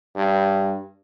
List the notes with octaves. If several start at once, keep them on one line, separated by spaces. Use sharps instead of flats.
G2